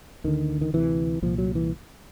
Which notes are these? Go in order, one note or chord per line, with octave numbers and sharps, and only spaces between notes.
D2 D3 D#3
D#3
D2 C3 E3
C2 A#2 F3
F#3
E3